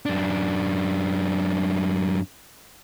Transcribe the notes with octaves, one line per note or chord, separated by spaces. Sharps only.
F#2 D4